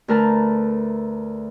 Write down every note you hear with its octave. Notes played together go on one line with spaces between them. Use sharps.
D2 A3 A#4 B4 A5 A#5